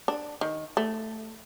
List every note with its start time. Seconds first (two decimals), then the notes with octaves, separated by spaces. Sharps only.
0.08 D4
0.41 D#3
0.77 A3